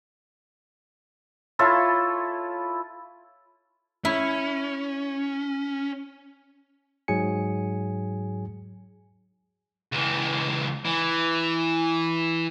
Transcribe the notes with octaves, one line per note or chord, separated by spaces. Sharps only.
E4 F4 A4 C#5
C#4 E4
G#2 F#3 G#4 G#5 C#7
C#2 E3
E3